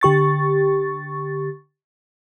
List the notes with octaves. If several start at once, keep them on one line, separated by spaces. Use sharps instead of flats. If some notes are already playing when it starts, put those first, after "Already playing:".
D3 G4 C#6 A6